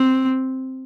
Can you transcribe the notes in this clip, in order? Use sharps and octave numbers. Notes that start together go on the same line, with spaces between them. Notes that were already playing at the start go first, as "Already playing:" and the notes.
Already playing: C4